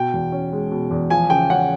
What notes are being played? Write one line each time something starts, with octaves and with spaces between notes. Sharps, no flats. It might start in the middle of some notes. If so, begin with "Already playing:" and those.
Already playing: B2 G5
E2
C#4
G#3
B2
E2
F3 G#5
C#3 G5
C#4 F#5